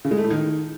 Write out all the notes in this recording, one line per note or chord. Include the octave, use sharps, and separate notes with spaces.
C#3
G#3
A3
A2
D#3